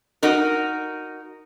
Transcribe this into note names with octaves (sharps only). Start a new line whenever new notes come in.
D#4 F#4 A#4